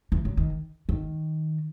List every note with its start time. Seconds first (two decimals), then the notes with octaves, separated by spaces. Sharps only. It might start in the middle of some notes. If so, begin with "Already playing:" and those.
0.12 E3
0.25 F#3
0.37 D#3
0.89 D#3